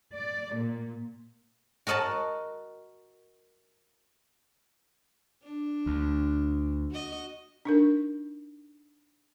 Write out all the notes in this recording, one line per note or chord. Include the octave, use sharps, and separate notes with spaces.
D5
A#2
F#4 A#4 D#5 F#5 A5
D4
D2
F#4 D#5
D4 D#4 A#4